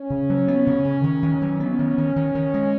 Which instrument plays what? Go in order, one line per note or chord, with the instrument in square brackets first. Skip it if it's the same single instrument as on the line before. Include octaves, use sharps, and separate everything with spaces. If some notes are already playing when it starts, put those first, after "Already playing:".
Already playing: [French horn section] C#4
[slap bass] C#3
F#3
B3
C#3
C#3
D#3
D#3
F#3
[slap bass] B3 [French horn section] C#4
[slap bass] D#3
D#3
D#3
D#3
G#3